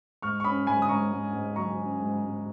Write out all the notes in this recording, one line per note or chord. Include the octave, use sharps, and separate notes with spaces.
G#2 C#6 F6
C#6
C#4 B5 D#6
G#2 G#5 B5
D#6
G#2 A#5 C#6
G#2
G#2
F#3 A#5 C#6
C#4
G#2
G#2